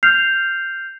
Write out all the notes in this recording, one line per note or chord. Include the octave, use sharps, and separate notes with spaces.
F6 G6 C7 F7